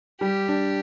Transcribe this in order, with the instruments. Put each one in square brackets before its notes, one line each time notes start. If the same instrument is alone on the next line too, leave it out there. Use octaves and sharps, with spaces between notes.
[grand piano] G3 [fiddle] G4
[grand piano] D4